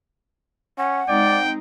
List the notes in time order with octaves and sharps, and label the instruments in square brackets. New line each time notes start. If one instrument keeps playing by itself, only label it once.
[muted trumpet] C#4 [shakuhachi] F#5
[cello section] G#3 C4 D#4 [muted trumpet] D5 [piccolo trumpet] G5